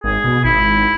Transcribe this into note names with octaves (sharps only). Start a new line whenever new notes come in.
G#1 G#4
B2
G#1 E4